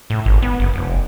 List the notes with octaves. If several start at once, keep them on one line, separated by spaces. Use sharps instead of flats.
A2
G#1
B3
F#1
F1